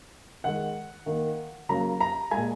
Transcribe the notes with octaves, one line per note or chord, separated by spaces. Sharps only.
D#3 G#3 F#5
D#3 A#3
C#3 F#3 A#3 A#5
A#5
A#2 G#3 G#5